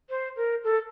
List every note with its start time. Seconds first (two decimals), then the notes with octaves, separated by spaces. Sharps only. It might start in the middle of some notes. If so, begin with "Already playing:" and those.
0.10 C5
0.36 A#4
0.64 A4